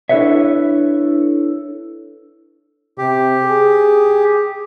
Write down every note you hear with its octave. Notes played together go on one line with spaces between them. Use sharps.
D4 E4 A4 B4 C#5 E5
C3 G4
G#4